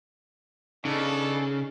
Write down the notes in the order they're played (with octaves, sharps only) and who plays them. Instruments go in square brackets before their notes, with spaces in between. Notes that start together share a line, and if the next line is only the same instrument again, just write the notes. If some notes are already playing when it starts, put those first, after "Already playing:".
[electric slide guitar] C#3 [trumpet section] B3 D4 A4 [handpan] D#4